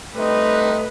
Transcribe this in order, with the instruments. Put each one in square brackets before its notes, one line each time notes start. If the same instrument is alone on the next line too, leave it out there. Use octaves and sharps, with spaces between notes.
[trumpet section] G3 C4 D#4 [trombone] A3 [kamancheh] B4